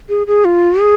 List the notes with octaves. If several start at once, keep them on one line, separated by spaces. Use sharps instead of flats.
G#4
G#4
F4
G#4